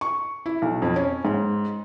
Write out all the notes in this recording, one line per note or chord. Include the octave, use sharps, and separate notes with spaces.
C#6
E4
B1
F2
C#4
G#2